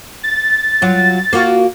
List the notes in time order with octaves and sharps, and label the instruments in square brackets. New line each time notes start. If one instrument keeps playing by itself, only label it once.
[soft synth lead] A6
[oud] F#3 F4
A#3 F4 F#4